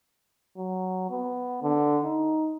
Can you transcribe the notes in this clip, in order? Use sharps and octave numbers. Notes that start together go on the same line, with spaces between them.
F#3
B3
D3
D#4